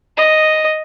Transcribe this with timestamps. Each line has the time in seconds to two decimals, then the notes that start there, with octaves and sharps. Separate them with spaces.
0.17 D#5